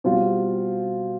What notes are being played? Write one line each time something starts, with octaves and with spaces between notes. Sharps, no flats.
B2 G3 C4 F4